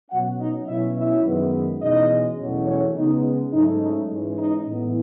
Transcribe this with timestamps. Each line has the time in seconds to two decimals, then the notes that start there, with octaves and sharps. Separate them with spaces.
0.10 B2 F#3 C#4 F#4 F#5
0.39 D#4 D#5
0.67 B2 F#3 C#4 E4 E5
0.96 E4 E5
1.24 F#2 D#3 G#3 B3
1.81 E2 B2 G#3 C#4 D#4 D#5
2.38 E2 B2 F#3 A3 C#4
2.67 C#4 C#5
2.95 C#3 G#3 B3 D#4
3.52 G#2 F#3 A3 C#4 D#4
3.81 D#4
4.10 G#2 E3 G#3 C#4
4.37 D#4
4.66 A2 E3 B3